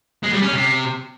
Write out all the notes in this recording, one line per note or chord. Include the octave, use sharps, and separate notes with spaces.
G#3
G3
C#4
C3